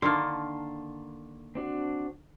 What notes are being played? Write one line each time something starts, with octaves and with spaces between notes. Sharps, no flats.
D3 D#3 A#3 A5 C6
C4 D4 F#4